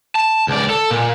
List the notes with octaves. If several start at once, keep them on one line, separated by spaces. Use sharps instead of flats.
A5
C#2 D5
A4
A#2